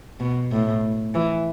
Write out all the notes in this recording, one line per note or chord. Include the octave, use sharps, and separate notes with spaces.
B2
A2
E3